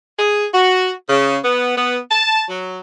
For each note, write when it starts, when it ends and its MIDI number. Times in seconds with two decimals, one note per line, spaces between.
0.19 0.46 68
0.54 0.92 66
1.10 1.37 49
1.44 1.73 59
1.77 1.98 59
2.11 2.44 81
2.49 2.79 54